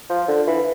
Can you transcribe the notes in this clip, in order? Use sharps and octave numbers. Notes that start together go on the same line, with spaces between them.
F3
D3
E3